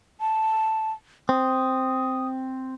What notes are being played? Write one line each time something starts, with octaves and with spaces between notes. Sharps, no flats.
A5
C4 D#6